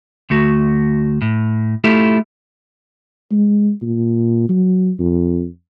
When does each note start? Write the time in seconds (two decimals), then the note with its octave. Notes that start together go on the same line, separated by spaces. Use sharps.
0.30 D2 A3 F#4
1.22 A2
1.84 A3 E4 F4 G4 A4
3.32 G#3
3.82 A#2
4.49 F#3
5.00 F2